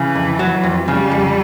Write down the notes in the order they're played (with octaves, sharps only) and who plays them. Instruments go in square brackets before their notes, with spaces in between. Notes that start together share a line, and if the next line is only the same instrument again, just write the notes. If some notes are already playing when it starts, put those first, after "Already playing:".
Already playing: [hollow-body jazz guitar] C#3 [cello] E3
[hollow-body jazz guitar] F2
F#3
F2
[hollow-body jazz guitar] C#3 [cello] G3
[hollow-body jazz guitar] F2